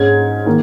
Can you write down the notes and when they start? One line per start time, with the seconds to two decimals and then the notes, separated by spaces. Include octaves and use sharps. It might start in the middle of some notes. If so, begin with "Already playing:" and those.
Already playing: G#2 G#3 C#4 G#6
0.46 D#3 A#3